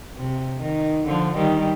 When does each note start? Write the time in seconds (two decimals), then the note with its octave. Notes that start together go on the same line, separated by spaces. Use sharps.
0.17 C3
0.62 D#3
1.07 D3 F3
1.37 D#3 G3